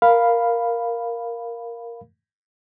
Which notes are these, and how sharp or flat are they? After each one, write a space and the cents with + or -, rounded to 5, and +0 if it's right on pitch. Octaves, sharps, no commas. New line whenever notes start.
A#4 +0 F5 +0 B5 +0